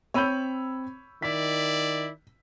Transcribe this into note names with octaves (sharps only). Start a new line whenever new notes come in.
C4 C#5 B5 E6 G6 D#7
D#3 E4 D5 B6